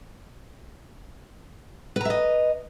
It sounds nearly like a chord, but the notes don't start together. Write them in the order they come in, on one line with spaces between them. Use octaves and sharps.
B4 A#5 E5 D#5